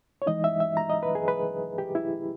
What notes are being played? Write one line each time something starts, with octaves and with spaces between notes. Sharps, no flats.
C#5
E3 G#3 D#4 D#5
E5
E5
A#5
D#5
B4
G#4
B4
G4
E4